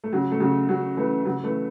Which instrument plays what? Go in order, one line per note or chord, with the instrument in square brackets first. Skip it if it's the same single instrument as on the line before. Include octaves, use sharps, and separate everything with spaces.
[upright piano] A3
C#3 F#3
A3
C#3 F#3
C#3 F#3
E3 A3
C#3 F#3
E3 A3